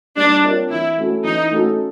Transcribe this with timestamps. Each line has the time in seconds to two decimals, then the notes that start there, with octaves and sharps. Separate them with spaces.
0.16 G3 D4
0.43 C4 F4 A#4 C#5
0.70 E3 E4
0.97 A3 C#4 F#4 A4
1.24 E3 D#4
1.51 A3 C#4 F#4 A4